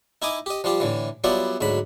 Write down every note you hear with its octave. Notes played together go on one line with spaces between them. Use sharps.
D#4 E4 D#5 G#5 D6 D#6
G4 D#5
F3 G3 F4 G4
A2 D3 E3
F#3 G3 B3 E4 F4 D5
D2 G#2 F#3 B5